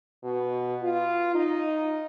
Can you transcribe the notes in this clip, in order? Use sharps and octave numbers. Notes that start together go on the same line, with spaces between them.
B2
F4
D#4